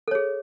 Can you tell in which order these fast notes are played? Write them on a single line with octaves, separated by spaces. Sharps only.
A4 C#5 G#4